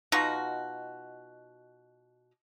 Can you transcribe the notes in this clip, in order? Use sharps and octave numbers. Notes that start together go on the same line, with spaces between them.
B2 D#4 F4 F#4